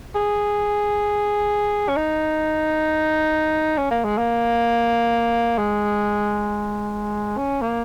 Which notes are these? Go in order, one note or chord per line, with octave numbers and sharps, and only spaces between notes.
G#4
C#4
D#4
C#4
A#3
G#3
A#3
G#3
C#4
A#3